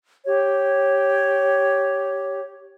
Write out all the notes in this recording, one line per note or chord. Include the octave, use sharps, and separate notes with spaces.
G4 C#5